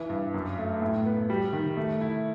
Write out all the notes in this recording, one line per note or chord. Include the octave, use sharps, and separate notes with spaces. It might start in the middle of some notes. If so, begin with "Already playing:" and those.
Already playing: E3
G2
F#2
A3
A2
B3
G3
D#3
A3
E4